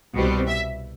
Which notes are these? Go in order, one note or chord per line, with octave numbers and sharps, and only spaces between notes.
C2 B2 G3 C4
E5